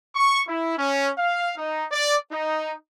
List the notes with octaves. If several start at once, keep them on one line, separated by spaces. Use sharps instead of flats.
C#6
E4
C#4
F5
D#4
D5
D#4